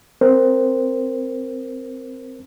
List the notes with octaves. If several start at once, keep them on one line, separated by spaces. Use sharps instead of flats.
C4 A#4 C5